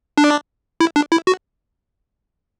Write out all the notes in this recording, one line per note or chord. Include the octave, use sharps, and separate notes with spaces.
D4
E4
D4
E4
F#4